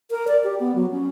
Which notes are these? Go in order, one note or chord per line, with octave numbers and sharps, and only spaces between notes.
A#4
D5
G4
B3
F#3
C#4